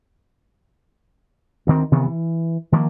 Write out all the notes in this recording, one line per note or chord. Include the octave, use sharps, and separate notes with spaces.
D2 D#3 C4
C3 D#3 E3 B3
E3
D#3 F3 A3 A#3